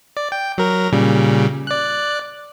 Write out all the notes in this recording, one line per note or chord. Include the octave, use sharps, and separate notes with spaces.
D5
G5
F#3 A#4
A#2 C#3 G3
D5 F#6